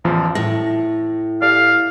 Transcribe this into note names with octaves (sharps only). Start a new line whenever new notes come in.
A1 E2 F3
A2 A#6
G4 A4 D5 F5